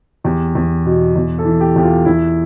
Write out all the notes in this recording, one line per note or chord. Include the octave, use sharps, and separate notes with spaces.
E2 G4
E2
B2
E2
A4
E3
G4
E2 G4
F4
E2 E4